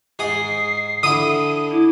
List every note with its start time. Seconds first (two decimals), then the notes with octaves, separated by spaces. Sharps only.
0.19 G#2 G#4 D#6 C7
1.03 D3 E4 D#6 D#7
1.71 E4 D6